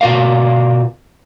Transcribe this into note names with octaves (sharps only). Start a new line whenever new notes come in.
B2 F4 F#4 A#4 F5